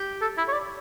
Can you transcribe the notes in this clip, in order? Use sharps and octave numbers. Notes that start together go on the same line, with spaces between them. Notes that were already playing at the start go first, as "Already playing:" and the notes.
Already playing: G4
A4
E4
C#5
D5